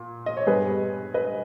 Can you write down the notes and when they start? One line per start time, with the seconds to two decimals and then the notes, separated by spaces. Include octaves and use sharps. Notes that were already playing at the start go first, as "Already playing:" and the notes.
Already playing: A#2
0.26 D#5
0.37 C#5
0.46 G2 G3 B3 G#4 B4
1.14 B4 D#5